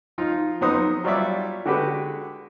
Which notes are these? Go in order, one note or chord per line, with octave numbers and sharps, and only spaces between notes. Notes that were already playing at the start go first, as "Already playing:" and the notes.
F3 D#4 F4
F2 F#3 B3 D#4 C5 D#6
F#3 G3 F4 C#5 D5 E5
D3 G#3 F#4 G4 B4